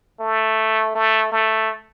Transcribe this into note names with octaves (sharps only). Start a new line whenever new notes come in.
A3
A3
A3